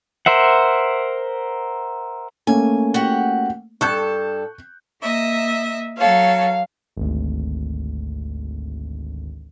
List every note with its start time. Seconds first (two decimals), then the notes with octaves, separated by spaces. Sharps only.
0.26 A#4 C5 E5 F#5
2.47 A3 A#3 C#4 G#5
2.94 F#4 G4 F#5
3.81 G2 A4 A5 C#6 F#6 G6
5.02 A#3 D#5 E5
5.98 F#3 A4 C#5 F5
6.97 G#1 D2